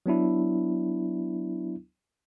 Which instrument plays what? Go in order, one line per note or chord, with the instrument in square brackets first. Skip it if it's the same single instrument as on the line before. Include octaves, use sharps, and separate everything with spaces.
[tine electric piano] F#3 B3 D4 E4